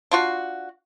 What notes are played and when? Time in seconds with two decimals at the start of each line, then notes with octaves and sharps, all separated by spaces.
0.11 D4 F4 F#4